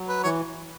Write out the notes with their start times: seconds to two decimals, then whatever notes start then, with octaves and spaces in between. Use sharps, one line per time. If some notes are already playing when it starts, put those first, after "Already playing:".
Already playing: F#3
0.08 B4
0.24 E3 C#5